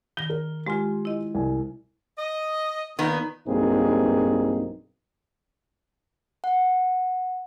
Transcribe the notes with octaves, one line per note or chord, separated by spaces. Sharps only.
D#3 A#6 G7
A#4
G#3 F4 G4 G#5 C6
E4 D#5
C2 G#5
D#5
A#2 D#3 B3
B1 G2 A#3 C4 D#4 G#4
F#5